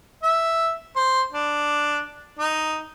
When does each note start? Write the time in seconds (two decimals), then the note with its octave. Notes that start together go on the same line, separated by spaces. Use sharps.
0.23 E5
0.96 C5
1.32 D4
2.39 D#4